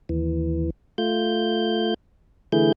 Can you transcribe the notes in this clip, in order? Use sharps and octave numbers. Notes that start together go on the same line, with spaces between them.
D#2 E3
A3 F4 G6
D3 E3 A3 E4 G#4 G6